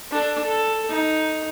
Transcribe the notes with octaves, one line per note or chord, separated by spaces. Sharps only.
D4 A4
A4
D#4